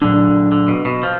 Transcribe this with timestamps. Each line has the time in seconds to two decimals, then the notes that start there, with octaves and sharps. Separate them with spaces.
0.02 A#2 D3 F#3 D4
0.52 D3
0.68 B2
0.85 B2
1.03 F3